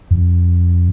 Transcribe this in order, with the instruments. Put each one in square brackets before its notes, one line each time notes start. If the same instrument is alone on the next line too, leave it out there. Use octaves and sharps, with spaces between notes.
[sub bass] F2